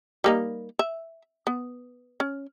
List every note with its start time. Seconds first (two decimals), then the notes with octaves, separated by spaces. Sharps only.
0.24 G3 A#3 D#4
0.79 E5
1.47 B3
2.20 C#4